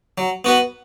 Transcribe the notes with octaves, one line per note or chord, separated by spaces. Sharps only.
F#3
B3 F#4 B4